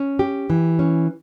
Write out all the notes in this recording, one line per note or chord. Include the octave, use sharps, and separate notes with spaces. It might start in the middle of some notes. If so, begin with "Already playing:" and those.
Already playing: C#4
G4
E3
C#4